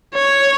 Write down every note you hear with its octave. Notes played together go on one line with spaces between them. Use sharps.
C#5